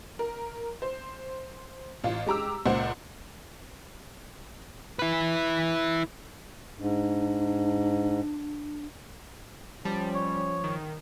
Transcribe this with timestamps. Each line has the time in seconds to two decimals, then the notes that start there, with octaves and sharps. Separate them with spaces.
0.19 A#4
0.82 C5
2.04 A1 F4
2.26 G#3 G4 A#5 D6 E6
2.66 C#2 A#2 C5 F#5
4.99 E4 B4
6.79 G#2 D4
9.85 F3 G3 C#4 A5
10.14 C#5
10.64 D#3